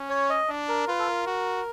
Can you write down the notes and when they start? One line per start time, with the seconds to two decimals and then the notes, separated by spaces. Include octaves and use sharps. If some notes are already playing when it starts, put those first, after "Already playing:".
Already playing: C#4
0.10 C#5
0.30 D#5
0.49 D4
0.69 A#4
0.88 F4 B4
0.99 A4
1.07 A#4
1.26 F#4